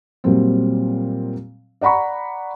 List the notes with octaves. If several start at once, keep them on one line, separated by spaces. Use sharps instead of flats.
A#2 F#3 G3 C4
D5 F#5 A#5 B5 C#6